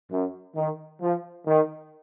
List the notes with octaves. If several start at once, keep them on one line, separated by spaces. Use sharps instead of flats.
F#2
D#3
F3
D#3